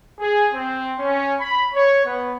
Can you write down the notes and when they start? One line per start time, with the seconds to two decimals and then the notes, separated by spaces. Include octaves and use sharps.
0.20 G#4
0.53 C4
0.98 C#4
1.40 B5
1.74 C#5
2.04 B3